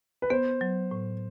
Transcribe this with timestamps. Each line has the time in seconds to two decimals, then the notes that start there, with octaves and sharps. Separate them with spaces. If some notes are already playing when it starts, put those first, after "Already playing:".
0.22 B4
0.30 B3 C5
0.61 F#3
0.91 A2